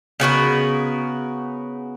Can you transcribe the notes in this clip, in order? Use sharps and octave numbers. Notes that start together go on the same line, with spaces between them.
C#3 B3 F#4 A#4